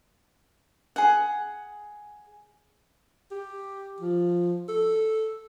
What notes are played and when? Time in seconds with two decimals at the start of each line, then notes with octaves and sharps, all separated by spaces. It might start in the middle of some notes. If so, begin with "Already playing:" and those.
0.96 G#4 F#5
3.31 G4
4.00 F3
4.69 A4